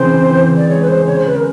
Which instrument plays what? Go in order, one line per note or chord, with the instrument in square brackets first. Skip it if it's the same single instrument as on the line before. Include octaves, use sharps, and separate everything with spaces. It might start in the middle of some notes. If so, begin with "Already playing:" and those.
Already playing: [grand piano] C#3 E3 C4 [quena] C5
[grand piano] C4
E3
C#3
[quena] D5
[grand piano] G#3 [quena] C#5
[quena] B4
[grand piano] G#3 [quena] C5
[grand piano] C#3 [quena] C#5
[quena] C5
[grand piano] C#3 [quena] B4
[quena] A#4